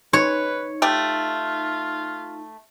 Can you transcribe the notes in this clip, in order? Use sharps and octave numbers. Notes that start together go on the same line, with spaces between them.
D#4 B4 C#5
A3 F4 G4